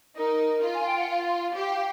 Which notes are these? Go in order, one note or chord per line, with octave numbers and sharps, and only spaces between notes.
D#4 A#4
F4
G#5
G5
F#5
F5
G4